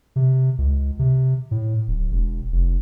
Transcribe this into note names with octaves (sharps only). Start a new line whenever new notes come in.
C3
C#2
C3
A2
D1
E1
F1